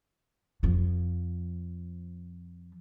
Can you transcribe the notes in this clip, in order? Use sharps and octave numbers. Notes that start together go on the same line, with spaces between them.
F2 F3